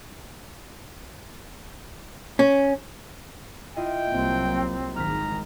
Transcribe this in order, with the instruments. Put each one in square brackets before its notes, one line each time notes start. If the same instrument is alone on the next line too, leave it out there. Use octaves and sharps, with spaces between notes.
[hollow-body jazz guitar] C#4
[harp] E4 F4 D#5 [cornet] G5
[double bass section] C2 F#3 A#3 [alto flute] C4
[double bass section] G#1 D#3 G#3 [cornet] A#5 [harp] F6 A#6 B6